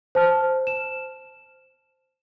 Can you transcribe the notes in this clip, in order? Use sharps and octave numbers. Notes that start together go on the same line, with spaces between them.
C5 A5 F6
E7